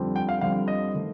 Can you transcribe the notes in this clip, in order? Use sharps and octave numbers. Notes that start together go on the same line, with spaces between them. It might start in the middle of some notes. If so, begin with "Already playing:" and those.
Already playing: F2 D3 G3 C4
G5
F5
F2 D3 G3 C4 F5
D#5
D#3 A3